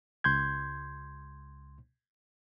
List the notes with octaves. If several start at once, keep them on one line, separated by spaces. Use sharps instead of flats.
C#2 C6 G6 G#6